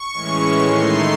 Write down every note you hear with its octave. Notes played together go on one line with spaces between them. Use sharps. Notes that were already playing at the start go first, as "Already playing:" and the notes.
Already playing: C#6
A2 E3 G#3 C#4
D#3 A3 D#4 C6